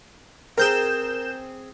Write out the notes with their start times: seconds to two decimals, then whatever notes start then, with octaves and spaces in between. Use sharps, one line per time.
0.58 C4 G#4 A#4 G6 E7